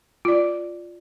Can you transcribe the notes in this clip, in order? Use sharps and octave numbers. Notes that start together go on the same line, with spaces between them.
F4 D5